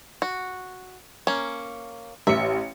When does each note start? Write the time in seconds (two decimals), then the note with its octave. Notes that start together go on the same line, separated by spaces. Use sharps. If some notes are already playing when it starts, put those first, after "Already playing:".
0.22 F#4
1.27 A#3 C#4
2.27 A1 E5 C#7